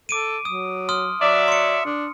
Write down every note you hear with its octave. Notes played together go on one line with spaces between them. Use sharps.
A4 D6 D7 D#7
F#3 D#6
C6 D#6 F6
F#3 D5 E5
C6 C#7
D4